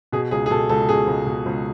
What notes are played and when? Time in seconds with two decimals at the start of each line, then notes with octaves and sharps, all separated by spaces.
0.13 B2 G#4
0.31 C#2 G#4
0.46 G#4
0.51 B2 A4
0.69 C#2 A4
0.89 B2 G#4
1.07 C#2
1.27 B2
1.46 C#2